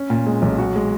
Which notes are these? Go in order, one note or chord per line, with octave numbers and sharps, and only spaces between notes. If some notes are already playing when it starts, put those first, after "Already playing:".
Already playing: C#4
A#2
G#3
B1
F#4
G#3